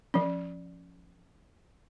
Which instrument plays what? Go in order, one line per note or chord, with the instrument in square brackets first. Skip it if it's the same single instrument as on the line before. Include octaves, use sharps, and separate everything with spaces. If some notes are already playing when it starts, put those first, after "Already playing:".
[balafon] F3 C#4